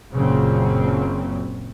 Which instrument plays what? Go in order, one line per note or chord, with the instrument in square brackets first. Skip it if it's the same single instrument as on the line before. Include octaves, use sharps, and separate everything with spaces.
[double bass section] F#1 A#2 C#3 F#3 C4